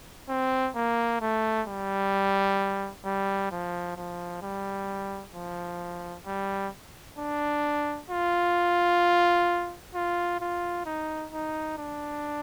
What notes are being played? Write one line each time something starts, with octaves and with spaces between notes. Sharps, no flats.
C4
A#3
A3
G3
G3
F3
F3
G3
F3
G3
D4
F4
F4
F4
D#4
D#4
D4